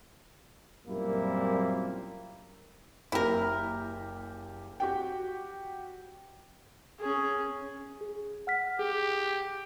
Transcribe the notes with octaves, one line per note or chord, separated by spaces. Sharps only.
F#2 A#2 G3 A#3 C4 E4
F#1 A#3 E4 G4 A#4
F#4 G4 G5
C#4 G#4
G#4
F#5 F6 B6
G4 G#4